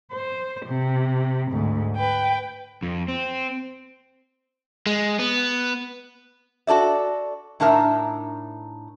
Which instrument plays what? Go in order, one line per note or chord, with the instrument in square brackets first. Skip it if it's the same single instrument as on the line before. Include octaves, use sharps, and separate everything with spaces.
[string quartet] C5
C3
D2 G#2
B4 G5
[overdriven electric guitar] F2
C4
G#3
B3
[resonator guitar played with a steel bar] F#4 A4 D5 E5
A2 D4 D#4 A#4 E5